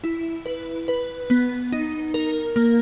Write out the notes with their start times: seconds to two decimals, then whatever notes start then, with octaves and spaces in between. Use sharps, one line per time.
0.04 E4
0.46 B4
0.88 B4
1.30 B3
1.72 D#4
2.14 A#4
2.56 A#3